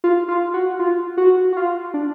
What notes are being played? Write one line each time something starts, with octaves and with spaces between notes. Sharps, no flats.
F4
F4
F#4
F4
F#4
F#4
F4
D4